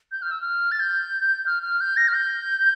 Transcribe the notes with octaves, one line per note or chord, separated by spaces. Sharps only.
G6
F6
E6
F6
A6
G6
F6
F6
G6
A#6
F6
G6